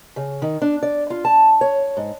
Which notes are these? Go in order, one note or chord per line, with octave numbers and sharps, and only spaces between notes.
C#3
D#3
D4
D5
F4
A5
C#5
G#2